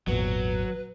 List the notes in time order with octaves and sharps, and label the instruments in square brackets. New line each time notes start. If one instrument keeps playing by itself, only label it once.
[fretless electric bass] G#1 [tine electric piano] E2 A#2 [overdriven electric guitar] F#3 [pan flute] B4